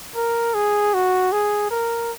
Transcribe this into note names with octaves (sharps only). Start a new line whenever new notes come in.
A#4
G#4
F#4
G#4
A#4